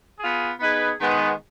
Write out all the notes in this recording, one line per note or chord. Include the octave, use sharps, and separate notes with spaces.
B3 F4 G#4
B3 D#4 G#4 B4
D#3 G#3 B3